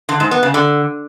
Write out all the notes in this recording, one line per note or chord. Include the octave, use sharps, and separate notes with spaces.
D3
G#2
B3
C#3
D3